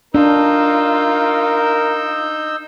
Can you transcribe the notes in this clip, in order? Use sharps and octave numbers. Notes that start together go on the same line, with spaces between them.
D4 D#4 F4 A#4 E6 G6